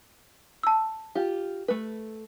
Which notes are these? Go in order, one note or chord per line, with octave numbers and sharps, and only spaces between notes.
A5 E6
F4 G4
A3 B4